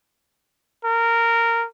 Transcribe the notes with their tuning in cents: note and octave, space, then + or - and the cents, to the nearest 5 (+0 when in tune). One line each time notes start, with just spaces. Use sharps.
A#4 -15